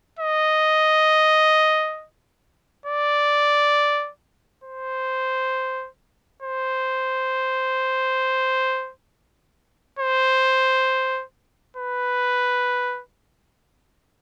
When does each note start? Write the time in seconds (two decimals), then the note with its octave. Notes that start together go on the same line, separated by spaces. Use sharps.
0.19 D#5
2.86 D5
4.64 C5
6.42 C5
9.99 C5
11.77 B4